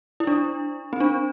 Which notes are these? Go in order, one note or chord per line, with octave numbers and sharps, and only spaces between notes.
E4
D4
C4
D4